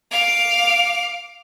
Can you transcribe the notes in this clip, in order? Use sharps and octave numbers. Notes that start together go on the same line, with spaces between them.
F5 D6